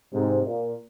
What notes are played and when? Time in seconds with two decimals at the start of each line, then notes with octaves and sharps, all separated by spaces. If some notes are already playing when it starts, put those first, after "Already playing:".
0.13 G#2 C3
0.44 A#2